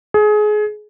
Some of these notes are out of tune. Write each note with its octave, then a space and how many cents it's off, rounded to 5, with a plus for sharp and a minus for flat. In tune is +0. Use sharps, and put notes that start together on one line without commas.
G#4 +25